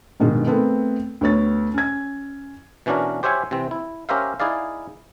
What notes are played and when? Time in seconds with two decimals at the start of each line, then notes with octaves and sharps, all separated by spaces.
0.20 G2 B2 D#3 G#3
0.47 A3 B3 C4 A4 A#4
1.21 D2 B3 C#5 A6
1.74 C#4 G#6
2.86 B2 E3 C#4 D4 F#4 A#4
3.23 G4 C5 C#5 E5 F#5 G#5
3.51 C3 E3 C4
3.71 E4
4.09 C#4 G4 A#4 C5 E5 F5
4.40 D#4 E4 G#4 D5 F5